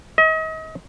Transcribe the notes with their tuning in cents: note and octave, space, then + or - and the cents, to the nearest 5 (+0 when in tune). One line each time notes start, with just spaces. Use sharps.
D#5 +35